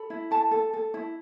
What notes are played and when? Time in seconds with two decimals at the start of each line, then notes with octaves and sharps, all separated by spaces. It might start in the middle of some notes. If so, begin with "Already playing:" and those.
Already playing: A4 B5
0.10 E4
0.31 A4 A5
0.51 A4
0.73 A4
0.94 E4